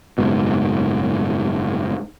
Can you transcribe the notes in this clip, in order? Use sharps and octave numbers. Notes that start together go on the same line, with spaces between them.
F#1 G#2 B2